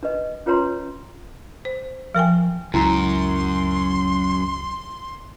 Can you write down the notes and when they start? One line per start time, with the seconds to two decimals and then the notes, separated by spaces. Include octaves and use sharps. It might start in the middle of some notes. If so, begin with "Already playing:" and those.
0.03 D4 B4 D#5
0.46 C#4 F4 B4 C#5 A#5 C6
1.65 C5
2.15 F3 A#4 G5 G#5
2.74 C#2 F#2 E4 A#5 C6